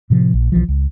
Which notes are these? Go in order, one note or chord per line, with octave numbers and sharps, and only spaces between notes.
A2 C3 F3
A#1
B1 E3 F3
C#2